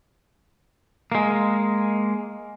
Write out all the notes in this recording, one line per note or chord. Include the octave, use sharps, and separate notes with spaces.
G#3 A#3